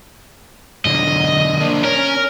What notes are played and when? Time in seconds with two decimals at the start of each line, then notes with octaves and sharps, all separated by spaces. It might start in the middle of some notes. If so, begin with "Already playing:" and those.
0.85 B1 D3 D#5
1.59 A#3 D4
1.84 C#4 A#4